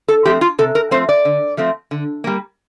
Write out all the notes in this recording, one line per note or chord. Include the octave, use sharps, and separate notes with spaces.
A4
F3 A3 C4 G4
F4
C3 A4
A#4
F3 A3 C4 C5
D5
D3
F3 A3 C4
D3
G3 A#3